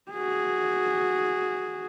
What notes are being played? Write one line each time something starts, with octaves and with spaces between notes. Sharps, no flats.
F#4 G#4